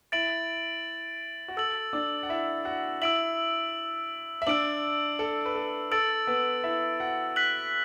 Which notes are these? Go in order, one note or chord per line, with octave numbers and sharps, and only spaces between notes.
E4 E5 A6 D7 F#7
F#4
A4 E6 A6 F#7
D4 D5
F#5
E4 E5
F#4 F#5
E4 E5 E6 D7 F#7
E5
D4 D5 E6 D7 F#7
A4
B4
A4
A4 E6 A6 D7 F#7
B3 B4
E4 E5
F#4 F#5
F#6 B6 F#7